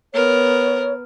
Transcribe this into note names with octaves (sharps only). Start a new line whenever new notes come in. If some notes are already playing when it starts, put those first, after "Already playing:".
B3 A#4 C#5